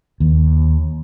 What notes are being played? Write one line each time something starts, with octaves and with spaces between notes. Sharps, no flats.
D#2